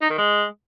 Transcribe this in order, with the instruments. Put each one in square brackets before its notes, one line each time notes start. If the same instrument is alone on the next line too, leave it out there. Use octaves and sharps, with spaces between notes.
[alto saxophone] D#4
D#3
G#3